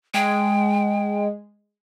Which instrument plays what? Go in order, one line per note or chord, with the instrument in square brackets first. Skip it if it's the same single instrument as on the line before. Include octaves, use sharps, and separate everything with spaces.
[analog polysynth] G#3 [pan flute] G5